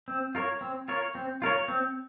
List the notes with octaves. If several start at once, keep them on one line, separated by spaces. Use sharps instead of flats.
C4
F4 A#4 C#5
C4
F4 A#4 C#5
C4
F4 A#4 C#5
C4